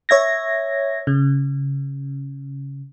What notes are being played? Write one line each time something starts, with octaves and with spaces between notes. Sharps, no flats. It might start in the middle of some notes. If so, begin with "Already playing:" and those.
C#5 E5 G#6 A#6
C#3